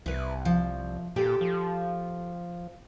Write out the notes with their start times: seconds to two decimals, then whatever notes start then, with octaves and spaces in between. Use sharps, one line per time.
0.06 C2 E4 B4
0.45 F3
1.16 A#2 G4 A4 G5
1.41 F3